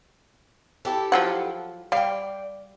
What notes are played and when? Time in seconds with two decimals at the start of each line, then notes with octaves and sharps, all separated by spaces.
0.85 E4 G4 A4
1.12 F3 F#3 F#5
1.92 G3 D5 F5 G5